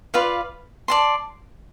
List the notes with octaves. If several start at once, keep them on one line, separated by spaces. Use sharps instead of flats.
F4 B4 D5 F5
D5 A5 C6